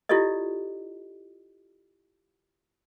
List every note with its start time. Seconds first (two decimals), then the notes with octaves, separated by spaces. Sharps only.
0.09 E4 F4 G4 A4 D5 D#5